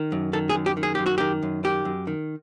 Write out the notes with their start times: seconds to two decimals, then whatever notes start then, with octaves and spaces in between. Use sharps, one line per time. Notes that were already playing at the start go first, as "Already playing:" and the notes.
Already playing: D#3
0.12 F#2
0.33 D#3 A4
0.49 G#4
0.55 F#2
0.66 G4
0.77 D#3
0.83 G#4
0.95 F#2 G4
1.06 F#4
1.18 D#3 G4
1.43 F#2
1.64 D#3 G4
1.85 F#2
2.07 D#3